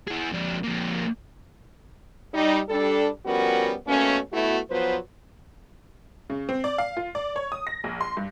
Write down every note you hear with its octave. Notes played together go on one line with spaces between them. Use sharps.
E4 G#4
F2 D4
F2 A#3
G3 D#4
G3 D4 A4
F3 G3 B3 C#4 F#4 A#4
B2 A3 A#3 C#4
B2 A3 B3 E4 F#4
F3 F#3 B3 B4 C5
C#3
C4
D5
F5
F4
D5
C#5
D#6
A#6
A#1
C6
G2